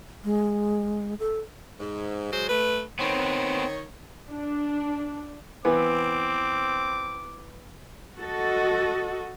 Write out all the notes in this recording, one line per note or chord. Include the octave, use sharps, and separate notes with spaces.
G#3
A4
G#2
F#3 G#3 C5
A3 B4
D#3 B3 C4 C#5
D4
E3 B3 C4 D6
F#4 A4 D#5